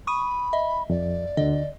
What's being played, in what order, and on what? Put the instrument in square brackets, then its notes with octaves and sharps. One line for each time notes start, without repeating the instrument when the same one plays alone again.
[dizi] B5 [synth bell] C#6 D#6 D#7
[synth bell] D#5 E5
[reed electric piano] F2 [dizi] D5
[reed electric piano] D2 D3 [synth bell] D#5